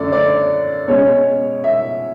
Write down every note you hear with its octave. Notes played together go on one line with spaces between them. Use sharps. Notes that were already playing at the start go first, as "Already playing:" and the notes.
Already playing: F#2 D3 A3 C#4 D5
D5
B2 G#3 C#4 C#5
E5